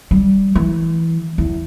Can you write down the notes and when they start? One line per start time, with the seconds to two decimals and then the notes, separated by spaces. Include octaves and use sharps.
0.11 G3
0.55 E3
1.38 E2